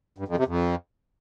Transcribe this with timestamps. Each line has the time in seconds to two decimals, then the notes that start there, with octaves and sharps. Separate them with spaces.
0.18 G2
0.28 F2
0.38 C3
0.47 F2